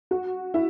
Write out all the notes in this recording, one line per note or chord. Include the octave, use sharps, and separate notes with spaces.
F#4
E4